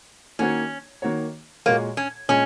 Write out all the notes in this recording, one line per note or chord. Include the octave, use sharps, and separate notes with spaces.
D#3 A#3 C#4 F#4 C#5
D#3 A#3 F#4 C#5
A#2 G#3 A#3 F#4 C#5
C#4
A#2 G#3 C#4